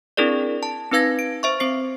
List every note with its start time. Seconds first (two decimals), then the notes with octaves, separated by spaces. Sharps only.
0.17 C4 D4 E4 G#4 A#4 D5
0.63 A5
0.92 C4 D#4 B4 F5 G#6 A#6
1.19 D7
1.43 C5 E5 C#6
1.60 C4 C5 C7